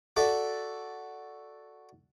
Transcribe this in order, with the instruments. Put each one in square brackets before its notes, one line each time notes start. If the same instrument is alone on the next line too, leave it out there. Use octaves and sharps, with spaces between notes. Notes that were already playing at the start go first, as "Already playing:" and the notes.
[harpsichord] F#4 A4 D5 E5